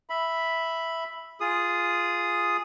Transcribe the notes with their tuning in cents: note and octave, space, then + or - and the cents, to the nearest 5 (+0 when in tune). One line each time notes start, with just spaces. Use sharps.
E5 +0 B5 +0
F4 +0 G#4 +0 D#6 +0